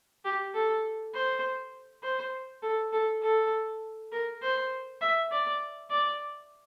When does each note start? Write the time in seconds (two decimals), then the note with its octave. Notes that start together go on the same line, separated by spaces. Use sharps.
0.25 G4
0.54 A4
1.14 C5
2.03 C5
2.62 A4
2.93 A4
3.22 A4
4.12 A#4
4.42 C5
5.01 E5
5.31 D5
5.90 D5